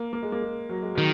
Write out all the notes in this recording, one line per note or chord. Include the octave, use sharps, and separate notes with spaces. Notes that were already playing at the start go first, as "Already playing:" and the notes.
Already playing: A#3
A#3
G#3
A#3
G#3
F#3
G#3
D#3 F#3